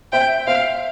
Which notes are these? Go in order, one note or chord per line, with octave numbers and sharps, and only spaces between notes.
C5 E5 G5
C5 E5 F5